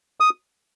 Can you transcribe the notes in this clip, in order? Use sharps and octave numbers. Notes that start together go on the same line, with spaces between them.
D#6